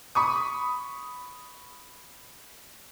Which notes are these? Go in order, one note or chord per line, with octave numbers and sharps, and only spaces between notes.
B5 C#6 D#6